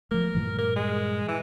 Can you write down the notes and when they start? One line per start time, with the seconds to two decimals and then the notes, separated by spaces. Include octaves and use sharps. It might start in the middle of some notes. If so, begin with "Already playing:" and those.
0.11 F3 A3 A#4
0.35 G2 A#2 E3
0.58 A#4
0.76 G#3
1.28 E3